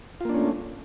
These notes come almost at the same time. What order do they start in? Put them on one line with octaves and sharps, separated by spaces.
F4 A#3 D4 C#4 A3